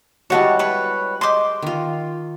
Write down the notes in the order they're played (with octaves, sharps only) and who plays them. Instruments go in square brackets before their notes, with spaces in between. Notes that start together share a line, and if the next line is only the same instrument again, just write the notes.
[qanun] G3 F#4 [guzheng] G#3 B3 E4 [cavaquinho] C#5 F#5 A5
[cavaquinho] B4 C#5
[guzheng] G4 G#4 D#5 [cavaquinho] C6 D6
[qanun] D#3 F4